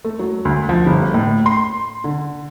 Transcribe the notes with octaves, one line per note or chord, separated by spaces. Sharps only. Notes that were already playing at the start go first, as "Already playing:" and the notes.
A3
F#3
D2
F3
G1
A2
C6
D3